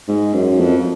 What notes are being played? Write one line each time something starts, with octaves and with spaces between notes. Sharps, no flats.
G#2
F#2
F2